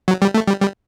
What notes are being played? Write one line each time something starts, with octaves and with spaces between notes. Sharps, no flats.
F#3
G3
A3
G3
G3